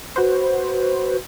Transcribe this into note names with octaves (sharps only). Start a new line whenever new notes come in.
F#4 B4 C5